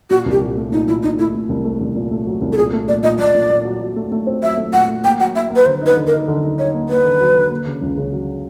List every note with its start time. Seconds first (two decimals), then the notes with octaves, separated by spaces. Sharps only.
0.10 A#2 F#4
0.26 C2
0.31 G4
0.41 A#2
0.57 A3
0.72 A#2 D#4
0.87 A#2 E4
1.03 A#2 D#4
1.19 A3 E4
1.35 A3
1.49 C2
1.65 A3
1.81 C2
1.96 A#2
2.11 A3
2.27 F#3
2.41 C2
2.52 A4
2.57 A#2 G#4
2.73 A3
2.88 A#2 D5
3.03 A#2 D#5
3.19 A#2 D5
3.34 A#2
3.50 A#2
3.65 F#3
3.81 F#3
3.96 A3
4.12 A3
4.27 C4
4.42 F#3 E5
4.57 A3
4.73 A#2 F#5
4.88 A3
5.04 A#3 G5
5.20 F#3 F#5
5.35 A#3 E5
5.50 A#3
5.56 B4
5.66 D3 C5
5.81 D#4 B4
5.97 D3
6.07 A#4
6.12 D#4
6.28 D3
6.43 D#4
6.58 D#4 C#5
6.74 A#3
6.89 A#3 B4
7.05 D3
7.20 F#3
7.36 D3
7.51 A#3
7.67 C#3
7.82 C#2
7.97 C#3
8.12 F#3